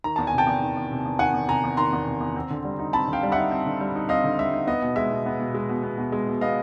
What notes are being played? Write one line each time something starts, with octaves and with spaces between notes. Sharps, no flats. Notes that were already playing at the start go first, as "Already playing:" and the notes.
D#3 A#5
E2 A5
G#5
C3
G5 A5
E2
D#3
E2
C3
E2
D#3 F#5 G#5
E2
C3 G#5 A#5
E2
D#3 A#5 C6
E2
C3
E2
C4
D3
G3
D#4
C4 A5 B5
D3 F5 G5
G3
E5 F#5
D#4
C4
D3
G3
D#4
C4 D#5 F5
D3
G3 E5
D#4
B3 D#5
B2
G#3 E5
B2
B3
B2
G#3
B2
B3
B2
G#3
B2
B3 D#5 F5